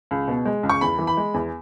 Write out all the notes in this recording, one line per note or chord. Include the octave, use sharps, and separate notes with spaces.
C#2
B2
G#3
C#2
C#6
E2 B5
E3
B5
G#3
E2